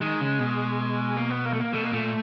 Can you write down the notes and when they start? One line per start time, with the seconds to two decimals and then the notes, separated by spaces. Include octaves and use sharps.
0.01 D#3 G#3
0.21 C#3
0.39 B2
1.17 A#3
1.30 B3
1.45 A#3
1.53 A3
1.60 A#3
1.74 B2 A3
1.84 A#3
1.93 A#2 A3